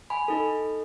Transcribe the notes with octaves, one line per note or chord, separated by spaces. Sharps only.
G#5 B5
D#4 A4